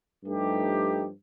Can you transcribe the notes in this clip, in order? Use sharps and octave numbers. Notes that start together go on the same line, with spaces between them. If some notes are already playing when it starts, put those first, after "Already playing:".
G2 F3 A3 D#4 G4